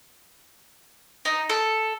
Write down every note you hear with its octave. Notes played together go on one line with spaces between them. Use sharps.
D#4
A4